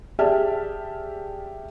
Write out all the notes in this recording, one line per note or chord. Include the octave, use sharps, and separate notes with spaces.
G4 G#4 D5 E5 A5 F6